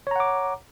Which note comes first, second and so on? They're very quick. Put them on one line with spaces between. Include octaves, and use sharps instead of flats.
C#5 A#5 F#5 D6